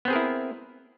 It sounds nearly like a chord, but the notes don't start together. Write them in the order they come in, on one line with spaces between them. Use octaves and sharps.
B3 C4 G#4 A#4 E4